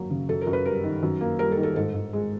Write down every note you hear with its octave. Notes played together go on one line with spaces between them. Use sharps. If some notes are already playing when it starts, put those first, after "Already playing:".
Already playing: F#2 F#3 A#3
C#3
F#2 A4
A#4
F#2
B4
G3 A#4
D#3
F#2
A#3
G3 A#4
A4
D#3
A4
G#2 A4
G#2
G#3